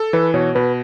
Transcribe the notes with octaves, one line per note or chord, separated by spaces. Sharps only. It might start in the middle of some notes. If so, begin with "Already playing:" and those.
Already playing: A4
E3 B4
B2 C#5
B2 B4